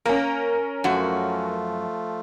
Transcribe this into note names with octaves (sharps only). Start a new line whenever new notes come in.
A#3 C#4 A#4
F#2 F3 A3 F#4